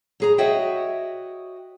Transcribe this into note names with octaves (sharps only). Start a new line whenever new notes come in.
F#3 G#4 A#5
F#4 C#5 D#5 E5 G5